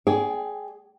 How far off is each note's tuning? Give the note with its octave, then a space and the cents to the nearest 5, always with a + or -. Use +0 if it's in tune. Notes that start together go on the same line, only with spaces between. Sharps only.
G#4 +10 D5 -25 G5 +0